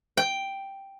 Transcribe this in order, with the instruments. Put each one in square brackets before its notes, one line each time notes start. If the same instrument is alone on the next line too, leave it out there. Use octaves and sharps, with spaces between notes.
[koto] G5